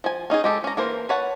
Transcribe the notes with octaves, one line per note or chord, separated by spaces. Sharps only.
F3 G#5
C#4 D#4 F4 G#4
G#3 G4 A4
C#4 A#5
E3 A#3 A#4 C5
B4 C#5 F#5 A5